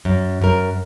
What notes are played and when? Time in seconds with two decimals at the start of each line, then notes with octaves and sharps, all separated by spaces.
0.05 F#2
0.41 F#2 A#4